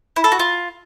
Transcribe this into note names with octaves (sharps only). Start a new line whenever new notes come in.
E4
A4
F#4
F4